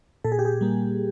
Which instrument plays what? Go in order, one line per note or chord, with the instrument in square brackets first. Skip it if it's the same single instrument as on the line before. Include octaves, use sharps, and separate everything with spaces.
[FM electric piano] A#2 A4
G#4
G4
G#4
G3 A#3